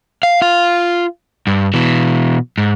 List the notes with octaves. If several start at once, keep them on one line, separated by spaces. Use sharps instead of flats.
F5
F4 F5
G2
B2 E3
G#2